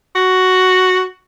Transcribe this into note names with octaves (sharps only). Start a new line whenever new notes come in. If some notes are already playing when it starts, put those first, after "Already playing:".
F#4